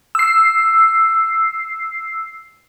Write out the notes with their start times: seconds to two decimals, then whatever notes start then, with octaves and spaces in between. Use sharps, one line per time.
0.15 E6 C7